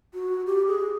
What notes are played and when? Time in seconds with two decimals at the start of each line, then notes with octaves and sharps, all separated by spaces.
0.14 F#4
0.47 G4
0.67 G#4